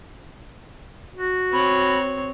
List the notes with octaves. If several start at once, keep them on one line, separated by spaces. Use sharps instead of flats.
F#4
C4 C#5 B5